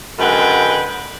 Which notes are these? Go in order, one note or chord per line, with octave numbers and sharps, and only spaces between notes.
F#2 D3 G#3 B4 F#5 G5